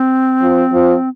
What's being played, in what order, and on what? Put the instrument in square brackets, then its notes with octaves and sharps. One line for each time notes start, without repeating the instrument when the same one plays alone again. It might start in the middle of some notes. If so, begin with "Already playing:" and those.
Already playing: [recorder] C4
[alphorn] F3
F3